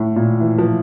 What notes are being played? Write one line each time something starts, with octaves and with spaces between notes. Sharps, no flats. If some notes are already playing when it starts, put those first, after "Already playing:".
Already playing: A2
A#2
E3
F3